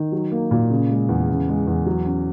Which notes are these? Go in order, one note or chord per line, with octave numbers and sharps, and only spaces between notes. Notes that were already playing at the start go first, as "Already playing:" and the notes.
Already playing: D#3
F#3
A#3
A#2
C#3
G#3
E2
C#3
G#3
E2
F#3
C#4